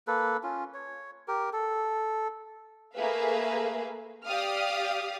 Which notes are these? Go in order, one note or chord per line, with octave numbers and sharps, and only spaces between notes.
A#3 A4 B4
C#4 F4
C#5
G4 A#4
A4
A3 A#3 G#4 B4 E5 F5
G4 D5 F5 D#6 F6